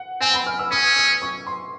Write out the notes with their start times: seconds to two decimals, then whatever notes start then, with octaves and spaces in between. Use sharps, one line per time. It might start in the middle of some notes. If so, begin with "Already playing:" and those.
Already playing: F#5
0.21 C4 G#5
0.34 B5
0.47 F6
0.59 E6
0.71 C#4 D#6
0.96 D#6
1.22 C#6
1.47 C6